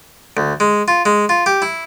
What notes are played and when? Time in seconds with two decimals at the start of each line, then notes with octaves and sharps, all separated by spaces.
0.37 D2
0.60 G#3
0.88 F4
1.05 G#3
1.29 F4
1.46 G4
1.62 E4